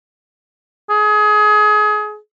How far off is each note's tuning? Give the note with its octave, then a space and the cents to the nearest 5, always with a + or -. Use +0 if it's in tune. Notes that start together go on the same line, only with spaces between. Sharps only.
G#4 +25